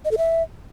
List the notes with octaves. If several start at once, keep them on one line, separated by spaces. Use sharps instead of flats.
D#5
A4
E5